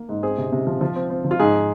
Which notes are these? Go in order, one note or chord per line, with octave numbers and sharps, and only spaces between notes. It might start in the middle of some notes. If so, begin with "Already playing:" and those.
Already playing: A#3
G#2
C4 G#4
C3
C3
F3
F3 F4
C4
C4
F3
F4
G#2 G#4